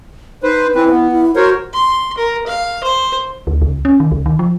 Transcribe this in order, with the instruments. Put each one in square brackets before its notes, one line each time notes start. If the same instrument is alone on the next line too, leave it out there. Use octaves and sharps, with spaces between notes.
[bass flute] D#4 [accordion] B4 C5
[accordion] E3 C4 B4 [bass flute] E4
[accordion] B3
[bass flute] E4
[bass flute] F#4 [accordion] A#4 C5 C#5
[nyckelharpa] C6
A#4
F5
C5
[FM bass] D2
C#2
C#4
D#3
C#2
D#3
F3